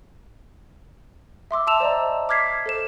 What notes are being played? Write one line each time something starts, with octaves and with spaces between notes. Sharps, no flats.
E5 C6 D6 E6
E5 A5 E6 E7 F7
C5 D5 D#5 A#5
D6 F6 G#6 B6 C7
A4 C5 E7